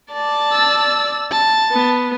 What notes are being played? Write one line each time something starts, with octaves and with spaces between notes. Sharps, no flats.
D5 A5
E6
A5
B3